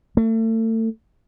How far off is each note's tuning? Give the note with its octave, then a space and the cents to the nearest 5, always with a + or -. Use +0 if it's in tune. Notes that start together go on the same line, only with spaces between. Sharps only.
A3 +35